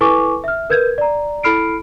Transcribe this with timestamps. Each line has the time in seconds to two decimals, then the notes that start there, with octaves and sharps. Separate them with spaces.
0.01 E4 A4 B4 G#5 C#6 D6
0.44 E5 F6
0.70 A#4 B4 G6 G#6
0.98 D5 A#5
1.43 E4 A4 B5 F6 C7 D7